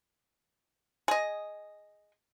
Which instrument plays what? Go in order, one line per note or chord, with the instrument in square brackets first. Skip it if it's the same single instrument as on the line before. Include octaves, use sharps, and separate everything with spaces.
[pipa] G#4 D#5